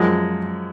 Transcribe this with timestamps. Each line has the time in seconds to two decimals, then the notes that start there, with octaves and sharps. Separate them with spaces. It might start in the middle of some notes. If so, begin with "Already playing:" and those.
Already playing: F#2 F3 G#3